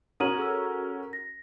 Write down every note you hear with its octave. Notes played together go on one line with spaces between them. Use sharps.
C#4 F#4 A#4 D#6 D#7 F#7
G#4 A4 E6
A#6